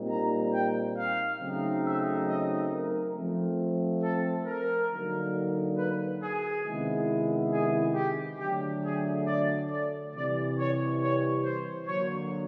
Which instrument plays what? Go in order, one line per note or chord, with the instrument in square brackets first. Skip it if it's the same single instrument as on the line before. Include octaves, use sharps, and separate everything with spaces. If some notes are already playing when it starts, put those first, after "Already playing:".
Already playing: [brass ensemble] A#2 G3 C4 D#4
A#5
G5
F5
C#3 F#3 A3 C4 D#4
E5
D#5
A#4
F3 A3 C4
A4
A#4
D3 F#3 A#3 D#4
B4
G#4
C3 D#3 G#3 B3 E4
G#4
G4
D3 F#3 A3 G4
G#4
D5
D5
C3 E3 G3 D5
C#5
C#5
C5
D3 F#3 A#3 C#5